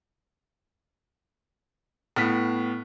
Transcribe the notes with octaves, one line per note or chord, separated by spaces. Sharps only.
A2 B3 F6 B6